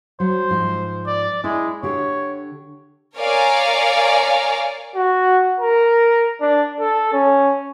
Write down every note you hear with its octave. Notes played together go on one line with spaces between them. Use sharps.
F#3 C5
G#2 F3 D#4
D5
G#3 E4
D3 G4 C#5
A#4 C#5 D5 F5 G#5 A#5
F#4
A#4
D4
A4
C#4